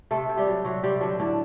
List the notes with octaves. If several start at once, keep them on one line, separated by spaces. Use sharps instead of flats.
C3 A3 A4
C3
G3 G4
F#3
C3 F#3 F#4
C3 G3 G4
D3 F#3 D4
A2 D3 D4